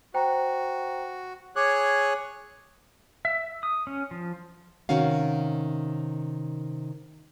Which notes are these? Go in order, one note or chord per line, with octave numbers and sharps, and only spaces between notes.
F#4 C5 G5 A#5
G#4 C#5 D6 F#6
E5
D#6
C#4
F3
C3 D#3 C#4 F#4 F5